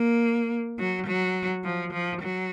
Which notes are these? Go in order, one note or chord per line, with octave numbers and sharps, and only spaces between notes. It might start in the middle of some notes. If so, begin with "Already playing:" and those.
Already playing: A#3
F#3
F#3
F3
F3
F#3